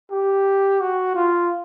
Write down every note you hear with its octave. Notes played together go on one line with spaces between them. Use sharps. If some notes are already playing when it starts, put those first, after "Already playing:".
G4
F#4
F4